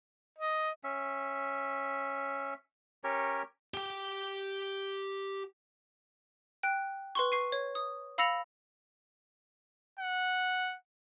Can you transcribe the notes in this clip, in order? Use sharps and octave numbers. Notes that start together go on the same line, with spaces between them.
D#5
C#4 E5
C#4 G4 A#4 C#5
G4 G5
G5 F#6
B4 C6 C#6
C#6 C7 D#7
C#5
D#6
F5 B5 E6 A#6 C#7 F7
F#5